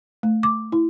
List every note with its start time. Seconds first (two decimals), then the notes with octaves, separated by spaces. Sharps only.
0.23 A3
0.43 D6
0.72 E4